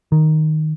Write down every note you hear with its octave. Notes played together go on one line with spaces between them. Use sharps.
D#3